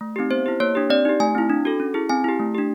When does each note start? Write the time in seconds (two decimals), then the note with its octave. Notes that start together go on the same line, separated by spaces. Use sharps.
0.01 A3
0.16 C4 D#4 G4
0.31 B3 C5
0.46 E4 G4
0.60 A#3 C#5
0.75 D4 G4
0.90 C4 D5
1.05 D#4 G4
1.20 A3 G#5
1.35 C4 E4
1.50 D4
1.65 F#4 A4
1.80 C#4
1.94 E4 G#4
2.09 C4 G#5
2.24 E4 G4
2.40 A3
2.55 D4 G4